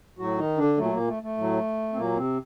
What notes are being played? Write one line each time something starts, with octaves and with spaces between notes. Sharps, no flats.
A2 F#3 F#4
D#3 D#4
D3 D4
A#2 F#3 A3
A#2 A#3
A3
A3
A2 F#3
C4
A#2 F#3 A#3
C3 C4